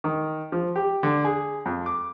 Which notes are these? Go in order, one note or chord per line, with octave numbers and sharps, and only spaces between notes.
D#3
F3
G4
D3
G#4
F2
D6